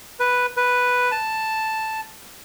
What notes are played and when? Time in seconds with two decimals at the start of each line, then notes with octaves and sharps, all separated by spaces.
0.20 B4
0.57 B4
1.11 A5